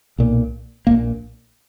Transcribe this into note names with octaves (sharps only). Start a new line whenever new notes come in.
B1 A#2
A#1 A#2 A#3